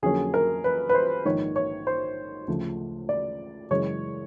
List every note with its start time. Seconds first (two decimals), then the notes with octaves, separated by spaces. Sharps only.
0.02 F2 D3 F#3 A#3 C#4 G#4
0.34 A#4
0.64 B4
0.89 B4
0.95 C5
1.25 A#1 G#2 D#3 C#5
1.56 C#5
1.87 C5
2.48 D2 C#3 F3 A3
3.09 D5
3.71 F#2 C#3 E3 G#3 C#5